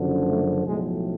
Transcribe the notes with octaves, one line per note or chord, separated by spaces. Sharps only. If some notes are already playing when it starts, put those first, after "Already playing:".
Already playing: F#1 F#2 D3 F3
A3
B1 A2 F3 G#3